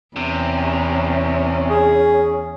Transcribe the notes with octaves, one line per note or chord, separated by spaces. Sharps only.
E2 C3 C#4
G#4